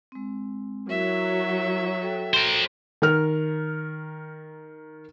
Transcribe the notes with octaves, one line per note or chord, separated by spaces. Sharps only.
G#3 C4
F#3 E4 A#4 E5
F#4 A4 G5
A#4 C5
D#3 A#4 F6